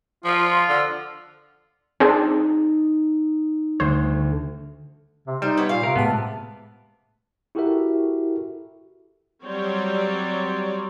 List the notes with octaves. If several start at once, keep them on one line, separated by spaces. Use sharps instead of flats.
F3 F4
D3
C4 D4 D#4 G#4
D2 C5
C3
G3 D#4 C5
B3 C#5
A#2 F5
C3 A#4
A2 G#3 B3 A5
E4 F#4 G4 A4 A#4 E5
F#3 G3 C4 C#5 D5